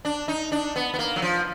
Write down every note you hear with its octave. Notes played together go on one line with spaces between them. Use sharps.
D4
D#4
D4
B3
B3
A#3
F#3
F3